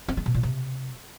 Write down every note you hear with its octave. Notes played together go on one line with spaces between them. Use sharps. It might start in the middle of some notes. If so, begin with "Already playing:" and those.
C4
G#3
B2
A#2
C3